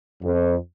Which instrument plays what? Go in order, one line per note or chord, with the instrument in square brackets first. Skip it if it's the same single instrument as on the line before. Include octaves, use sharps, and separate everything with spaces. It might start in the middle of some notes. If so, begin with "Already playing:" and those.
[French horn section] F2